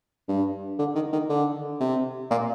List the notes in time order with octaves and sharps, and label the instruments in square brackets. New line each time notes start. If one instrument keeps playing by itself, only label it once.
[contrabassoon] G2
D3
D#3
D#3
D3
C3
A#2